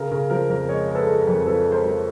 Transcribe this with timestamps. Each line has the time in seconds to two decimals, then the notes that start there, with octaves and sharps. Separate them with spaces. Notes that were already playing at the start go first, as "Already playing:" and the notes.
Already playing: C#3 A#4
0.11 C#3 A#4
0.30 F3 A#4
0.50 F2 A#4
0.69 G#3 C#5 D#5
0.88 G#3
0.95 A4 B4
1.07 G#3
1.21 A#4
1.27 F2
1.46 F3 A4 B4
1.66 G#3
1.72 A#4 C5
1.85 F3